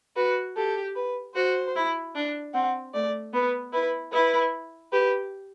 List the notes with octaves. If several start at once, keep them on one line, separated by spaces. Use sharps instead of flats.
F#4 B4
G4 A4
B4
F#4 C5
E4
D4
C4 F#5
A3 D5
B3 B4
E4 B4
E4 B4
G4 B4